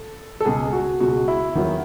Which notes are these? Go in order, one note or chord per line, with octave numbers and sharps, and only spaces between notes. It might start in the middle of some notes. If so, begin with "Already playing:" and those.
Already playing: A4
A4
C#2 B2 G#3 G#4
F#4
C#2 B2 G#3 F#4
E4
E2 D#3 F#3